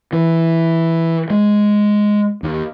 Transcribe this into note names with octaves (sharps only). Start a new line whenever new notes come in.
E3
G#3
D#2